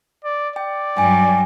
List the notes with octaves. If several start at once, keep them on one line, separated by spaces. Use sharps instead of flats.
D5
D5 G5
G2 F#3 G5 G#5